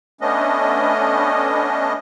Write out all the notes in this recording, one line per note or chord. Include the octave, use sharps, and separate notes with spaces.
A3 B3 C#4 D4 D#5